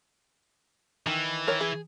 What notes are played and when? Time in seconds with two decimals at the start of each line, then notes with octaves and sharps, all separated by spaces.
1.07 D#3 E3
1.47 D#3 A#4 C#5
1.61 G#4